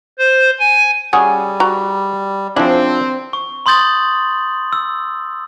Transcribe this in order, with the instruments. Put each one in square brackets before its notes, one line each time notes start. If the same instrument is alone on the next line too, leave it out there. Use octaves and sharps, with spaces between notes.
[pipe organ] C5
G#5
[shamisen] C#3 F#4 G#5 [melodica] G3 [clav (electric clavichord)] G#4
[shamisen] F#4 A#5
[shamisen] C#3 E4 G#4 [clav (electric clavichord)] F3 D4 [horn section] C4
[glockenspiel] C#6
B5 C6 D#6 G6 A6 F#7
E6